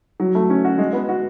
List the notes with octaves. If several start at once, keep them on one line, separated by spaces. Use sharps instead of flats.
F#3
A3
C#4
F#4
G#3
B3
F#4